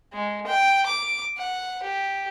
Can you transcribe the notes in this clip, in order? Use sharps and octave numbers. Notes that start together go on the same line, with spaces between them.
G#3
G5
D6
F#5
G4